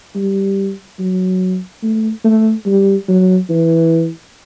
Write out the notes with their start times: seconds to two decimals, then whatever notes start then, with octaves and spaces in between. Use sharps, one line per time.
0.15 G3
0.99 F#3
1.83 A3
2.24 A3
2.66 G3
3.08 F#3
3.50 E3